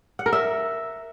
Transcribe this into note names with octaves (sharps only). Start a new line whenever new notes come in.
F#5
A#4
E5